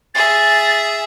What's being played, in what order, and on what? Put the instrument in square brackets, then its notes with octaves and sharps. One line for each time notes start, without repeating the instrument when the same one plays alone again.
[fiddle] G#4 E5 [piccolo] A6